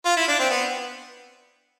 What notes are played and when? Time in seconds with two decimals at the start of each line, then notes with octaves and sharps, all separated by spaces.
0.05 F4
0.16 E4
0.28 D4
0.39 C4
0.50 B3